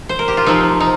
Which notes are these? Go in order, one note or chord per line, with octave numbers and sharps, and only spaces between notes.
C5
A#4
G4
F4
C3 F3 C4 D#4
D#4